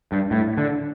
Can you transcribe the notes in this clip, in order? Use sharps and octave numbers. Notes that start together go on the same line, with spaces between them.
G2
A2
D3